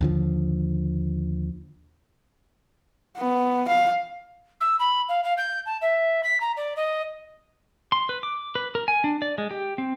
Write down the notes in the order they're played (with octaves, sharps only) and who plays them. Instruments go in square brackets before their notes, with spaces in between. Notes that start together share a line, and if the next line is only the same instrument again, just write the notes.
[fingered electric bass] D#2 D3 F3
[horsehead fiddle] B3
F5
[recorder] E6
B5
F5
F5
G6
A5
E5
B6
A#5
D5
D#5
[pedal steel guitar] C6
B4
D6
B4
A#4
G#5
D4
D5
G#3
G4
C4